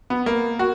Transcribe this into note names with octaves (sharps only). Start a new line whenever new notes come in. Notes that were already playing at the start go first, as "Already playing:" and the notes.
B3
A#3
F#4